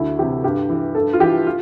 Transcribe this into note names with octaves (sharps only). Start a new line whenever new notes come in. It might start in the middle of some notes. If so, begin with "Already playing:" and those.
Already playing: D2 E4
C3 E3 G4
G2 G4
E3
G2 A4
F4
E3 G4
F4